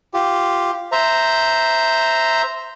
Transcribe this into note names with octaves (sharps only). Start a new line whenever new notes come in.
F4 G4
C5 E5 A#5